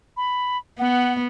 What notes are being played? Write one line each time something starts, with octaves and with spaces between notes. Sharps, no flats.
B5
B3 F#5